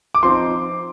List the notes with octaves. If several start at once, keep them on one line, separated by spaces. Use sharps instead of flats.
D6
F3 C4 D#4 C6